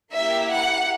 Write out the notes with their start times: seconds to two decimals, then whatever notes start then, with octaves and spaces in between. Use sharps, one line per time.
0.13 A#3 E4 G4 E5
0.50 F#5